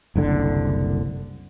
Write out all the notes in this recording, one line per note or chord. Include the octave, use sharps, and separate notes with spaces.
F#1 C2 D3